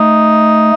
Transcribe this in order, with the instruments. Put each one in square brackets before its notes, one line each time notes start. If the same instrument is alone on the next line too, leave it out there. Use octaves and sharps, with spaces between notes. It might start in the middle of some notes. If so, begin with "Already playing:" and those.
Already playing: [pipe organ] A3 [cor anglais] D#4